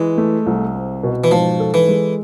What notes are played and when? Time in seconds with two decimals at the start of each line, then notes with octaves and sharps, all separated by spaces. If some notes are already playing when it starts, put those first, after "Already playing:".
Already playing: E3 G#3
0.18 A3
0.46 C2
0.74 C4
1.03 B2
1.24 E3
1.31 G#2 F3
1.60 A4
1.74 E3
1.88 G#3